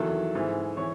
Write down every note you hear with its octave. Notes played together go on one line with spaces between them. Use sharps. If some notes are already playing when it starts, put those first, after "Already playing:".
Already playing: E2 D#3 F#3 A4
G#2 E3
E3 C#5